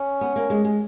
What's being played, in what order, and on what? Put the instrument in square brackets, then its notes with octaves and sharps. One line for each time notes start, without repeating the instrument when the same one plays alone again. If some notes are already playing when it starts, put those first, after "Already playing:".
Already playing: [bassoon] C#4
[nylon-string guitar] B3
A#3
G#3
G#3